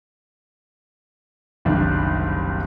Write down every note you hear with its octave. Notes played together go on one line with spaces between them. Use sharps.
F#1 C2 D#3 D4